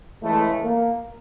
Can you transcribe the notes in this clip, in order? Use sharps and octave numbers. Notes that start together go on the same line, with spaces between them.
C#2 C#3 E3 G#3 A3
A#3